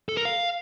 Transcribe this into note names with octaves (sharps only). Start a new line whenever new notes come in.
A4
A#4
F5